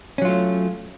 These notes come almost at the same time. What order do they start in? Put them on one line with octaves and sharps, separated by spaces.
C#4 F#3 F4 A3